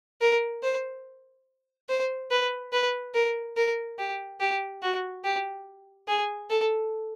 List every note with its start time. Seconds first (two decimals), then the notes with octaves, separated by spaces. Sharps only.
0.21 A#4
0.63 C5
1.89 C5
2.31 B4
2.72 B4
3.14 A#4
3.57 A#4
3.98 G4
4.40 G4
4.82 F#4
5.24 G4
6.08 G#4
6.50 A4